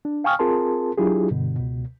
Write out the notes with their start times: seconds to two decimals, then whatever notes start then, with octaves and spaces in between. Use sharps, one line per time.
0.05 D4
0.24 F5 G5 G#5 C#6 D#6 F6
0.39 C4 F4 G#4 A#4 A5 C6
0.98 F#3 D4 E4 F4 G4 G#4
1.31 G2 B2 D3
1.55 C#2 B2